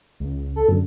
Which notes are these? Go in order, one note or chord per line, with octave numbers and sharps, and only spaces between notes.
C#2
A4
F#2 D3